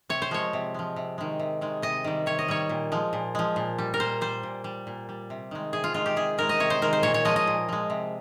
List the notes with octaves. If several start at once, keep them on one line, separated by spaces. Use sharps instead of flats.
C3 C#5
C5
F3 G#3 C#5
C3
F3 G#3
C3
D#3 G#3
C3
D#3 G#3
C3 D#5
D#3 G3
C3 C#5
D#5
D#3 G3 C#5
A#2
F3 G#3
A#2
F3 G#3
A#2
G3
A#4
A#2 C5
G3 C5
A#2
G3
A#2
G3
C3
D#3 G#3
C3 G#4
F4
D#3 G#3 F4
G4
C3 G#4
D#3 G#3 A#4
D#5
C3 C#5
C5
D#3 G#3 A#4
C5
A#2 C#5
C#5
F3 G#3 D#5
D#5
A#2
F3 G#3
C3